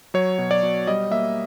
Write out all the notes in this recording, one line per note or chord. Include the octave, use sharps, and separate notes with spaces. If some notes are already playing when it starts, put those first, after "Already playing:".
F#3 C#5
B2
D5
B2
G3 D#5
A#3 E5